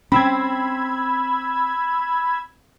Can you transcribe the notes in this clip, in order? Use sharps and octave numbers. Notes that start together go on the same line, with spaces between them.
C4 C#4 B5 E6 G#6